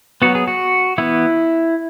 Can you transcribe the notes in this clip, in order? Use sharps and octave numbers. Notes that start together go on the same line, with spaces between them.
F#3 B3 F#4
G#4
F#4
E3 B3 E4